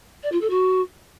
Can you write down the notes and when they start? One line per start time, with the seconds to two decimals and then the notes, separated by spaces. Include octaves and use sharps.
0.23 D5
0.32 F4
0.41 A4
0.50 F#4